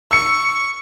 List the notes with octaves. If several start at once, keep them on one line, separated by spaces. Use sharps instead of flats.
C#6 E6 C#7